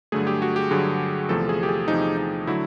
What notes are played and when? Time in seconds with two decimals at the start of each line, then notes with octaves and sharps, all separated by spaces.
0.12 G2 D3 F#3 A3 G#4
0.27 G4
0.42 F#4
0.56 G4
0.71 G2 D3 F#3 A3 G#4
1.29 E2 C3 F3 A3 A4
1.49 G#4
1.63 G4
1.69 G#4
1.88 E2 C3 F3 A3 D#4
2.17 D#4
2.47 D3 F#3 A3 E4